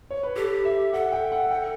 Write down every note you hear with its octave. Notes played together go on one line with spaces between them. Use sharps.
C#5
B4
G4 A4
E5
A4 F#5
G5
F#5
G5